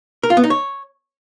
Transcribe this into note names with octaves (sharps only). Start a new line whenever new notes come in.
A#4
F4
B3
D#4
C#5